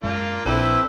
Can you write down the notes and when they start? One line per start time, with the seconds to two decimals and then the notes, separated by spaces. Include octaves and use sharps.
0.03 F#2 G#3 A#3 D4 F4
0.46 A#1 C4 D4 E4 A4 B4 C5